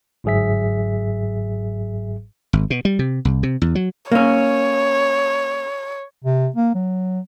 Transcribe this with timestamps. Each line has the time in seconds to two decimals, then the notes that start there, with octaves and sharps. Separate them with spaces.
0.24 G1 G#2 F#3 G#4 E5 B6
2.53 G#1
2.70 B2
2.85 G3
2.99 C3
3.25 C2
3.43 C3
3.62 E2
3.75 F#3
4.12 A#3 C#4 C#5
6.24 C3
6.56 A#3
6.75 F#3